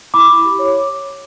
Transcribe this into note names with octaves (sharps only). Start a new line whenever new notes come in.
E4 B5 D6
E4
G4
C#5